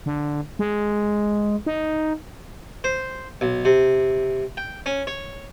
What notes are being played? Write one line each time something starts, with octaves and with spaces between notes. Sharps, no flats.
D3
G#3
D#4
C5
B1
C3
G5
C#4
C#5